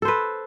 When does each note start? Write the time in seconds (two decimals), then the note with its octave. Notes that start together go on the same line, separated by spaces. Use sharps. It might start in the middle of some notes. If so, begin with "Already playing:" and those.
0.02 A4
0.05 C5
0.08 B4